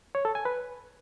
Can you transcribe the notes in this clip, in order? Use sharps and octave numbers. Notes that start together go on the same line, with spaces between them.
C#5
A4
G#5
B4